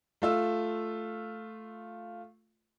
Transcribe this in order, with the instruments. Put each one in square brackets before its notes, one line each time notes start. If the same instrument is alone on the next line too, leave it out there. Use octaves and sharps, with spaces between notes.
[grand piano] A3 F4 E6